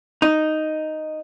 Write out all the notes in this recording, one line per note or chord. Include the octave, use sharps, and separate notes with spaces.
D#4